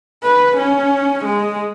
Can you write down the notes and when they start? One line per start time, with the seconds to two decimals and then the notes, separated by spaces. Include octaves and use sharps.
0.24 B4
0.57 C#4
1.25 G#3